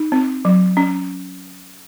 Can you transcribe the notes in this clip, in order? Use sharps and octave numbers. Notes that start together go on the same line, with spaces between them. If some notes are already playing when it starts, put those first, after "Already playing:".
Already playing: D#4
C4
F#3
C#4